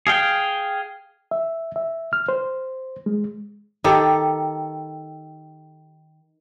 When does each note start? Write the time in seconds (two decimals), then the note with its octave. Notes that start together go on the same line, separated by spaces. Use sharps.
0.07 G#4 F5 G5
1.31 E5
1.76 E5
2.13 F6
2.29 C5
3.06 G#3
3.84 D#3 G4 A4